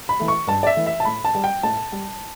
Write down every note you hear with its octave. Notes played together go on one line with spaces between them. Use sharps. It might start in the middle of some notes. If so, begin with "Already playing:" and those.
B5
E3 A3
C#6
G2 A5
D5
E5
E3 A3
E5
A5
A2 B5
A5
G3
G5
A2 A5
G3